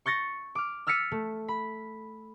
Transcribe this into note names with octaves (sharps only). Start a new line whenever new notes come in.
C#6 G6 A6 A#6 C#7
D6 F6
E6 F6 A6 B6 C#7 D#7
A3
B5